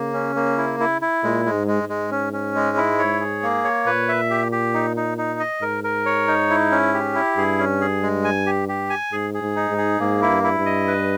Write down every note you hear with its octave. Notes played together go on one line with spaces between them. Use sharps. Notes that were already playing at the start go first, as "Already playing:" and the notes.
Already playing: C#3 A#3
C#4
A#3
E4
E4
E4
A#2 G#3
G#3
G#2
G#3
G#2
G#3
C#4
C#4
G#3
E4
C#5
G#4
A#3
C#5
A#2 B4
E5
G4
G4
D#4
D#4
D#4
D#5
G#2 A#4
A#4
C#5
D#4
E4
C#4
G4
E4
G2 G#4
C#4
G#4
G#3
G#5
G4
G4
G#5
G#2 G#4
G#4
G#2
D#4
G#2
G#4
G#2 A#3
E4
G2
E4
G2
D#5
B4